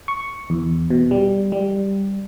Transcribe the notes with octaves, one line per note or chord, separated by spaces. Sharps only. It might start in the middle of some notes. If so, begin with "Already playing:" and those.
C#6
E2
B2
G3
G3